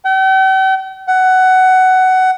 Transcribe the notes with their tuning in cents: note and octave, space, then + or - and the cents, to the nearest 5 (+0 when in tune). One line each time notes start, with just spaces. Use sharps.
G5 -45
F#5 +15